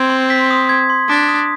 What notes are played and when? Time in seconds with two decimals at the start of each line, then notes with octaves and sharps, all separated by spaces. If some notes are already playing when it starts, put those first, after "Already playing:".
Already playing: C4 G#6
0.10 C6
0.30 B6
0.50 D#6
0.69 G#6
0.90 C6
1.09 D4 B6
1.29 D#6